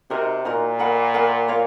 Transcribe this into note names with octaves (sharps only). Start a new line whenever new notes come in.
C3 D#4 F#4 A#4 D#5
A#2 D#4 F#4 A#4 D#5
A#4 D#5 F#5 B5
A#4 D#5 F#5 B5
F4 A#4 C#5 F5